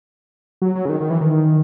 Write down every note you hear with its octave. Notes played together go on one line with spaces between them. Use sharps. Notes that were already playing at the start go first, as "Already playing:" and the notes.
F#3
F#3
C#3
D#3
D#3
E3
D#3